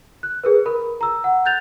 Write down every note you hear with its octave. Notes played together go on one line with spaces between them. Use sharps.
F#6
G#4 A#4 B4
A#4 B5
A#5 E6
F#5
F#6 G6 A6 F7